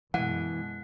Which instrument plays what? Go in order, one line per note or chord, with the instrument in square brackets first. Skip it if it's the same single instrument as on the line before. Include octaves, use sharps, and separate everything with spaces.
[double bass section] F#2 B2 G#3 [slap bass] E3 [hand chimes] F#5